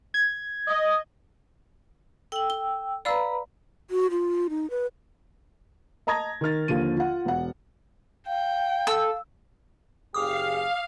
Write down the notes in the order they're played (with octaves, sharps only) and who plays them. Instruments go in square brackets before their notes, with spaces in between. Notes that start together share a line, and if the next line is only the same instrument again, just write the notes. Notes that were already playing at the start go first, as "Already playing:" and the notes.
[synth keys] G#6
[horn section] D#5
[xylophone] A4 F#7 [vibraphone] G5 E6
[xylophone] G7
[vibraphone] B4 A#5 B5 [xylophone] D5 F5 E6
[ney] F#4
F4
D#4
B4
[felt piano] D#5 A5 A#5 D#6 G#6 A#6
D#3 D#4 F6 A6
D#2 D3 F3 D#7
F4 F#5
E1 F#5
[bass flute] F5 [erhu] G5
[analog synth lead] A4 [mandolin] E6
[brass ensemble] F#1 G4 G#4 [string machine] F5 [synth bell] D6 D#6